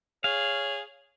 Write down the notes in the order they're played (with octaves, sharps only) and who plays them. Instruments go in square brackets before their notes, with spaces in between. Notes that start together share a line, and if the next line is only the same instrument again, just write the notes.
[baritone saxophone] G#4 [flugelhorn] C#5 [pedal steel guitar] F5